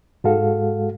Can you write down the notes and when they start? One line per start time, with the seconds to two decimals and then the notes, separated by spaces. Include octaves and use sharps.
0.24 G#2 G#3 F#4 A4 F5